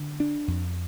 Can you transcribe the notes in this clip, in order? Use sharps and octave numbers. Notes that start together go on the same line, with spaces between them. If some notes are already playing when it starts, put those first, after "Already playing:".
Already playing: D3
D4
F2